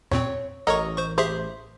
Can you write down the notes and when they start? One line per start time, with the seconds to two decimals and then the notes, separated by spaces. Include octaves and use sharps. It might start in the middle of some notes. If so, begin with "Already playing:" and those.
0.12 E2 A#2 C4 C#5
0.67 A1 A4 A#4 C#5 D#5 C#6
0.97 C5 C#6
1.18 G4 G#4 C5 E5